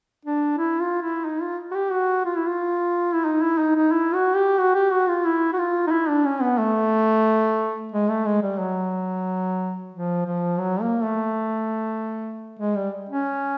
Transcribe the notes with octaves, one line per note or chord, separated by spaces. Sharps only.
D4
E4
F4
E4
D#4
F4
F#4
G4
F#4
F4
E4
F4
E4
D#4
E4
D#4
D#4
E4
F#4
G4
F#4
G4
F#4
F4
E4
F#4
F4
D#4
E4
D4
C#4
B3
A3
G#3
A3
G#3
G3
F#3
F3
F3
F#3
A#3
A3
G#3
G3
C#4